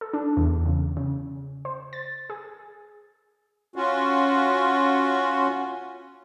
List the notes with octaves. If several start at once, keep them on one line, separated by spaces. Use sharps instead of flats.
A4
D4
E2
C#3
C#3
C5
A6
G#4
C#4 F4 F#4